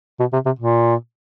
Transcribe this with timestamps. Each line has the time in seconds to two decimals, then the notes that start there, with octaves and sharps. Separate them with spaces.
0.20 B2
0.33 C3
0.45 C3
0.59 A#2